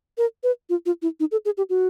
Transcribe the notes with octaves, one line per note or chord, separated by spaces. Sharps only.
A#4
B4
F4
F4
E4
D#4
A4
G#4
G4
F#4